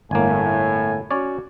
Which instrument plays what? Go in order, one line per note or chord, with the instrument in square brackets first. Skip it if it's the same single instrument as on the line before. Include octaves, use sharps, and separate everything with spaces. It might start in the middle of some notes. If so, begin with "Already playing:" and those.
[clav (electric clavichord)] G1 A#3 [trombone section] A2 [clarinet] G#5
[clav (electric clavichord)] C#4 C#5 D5 [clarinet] F#4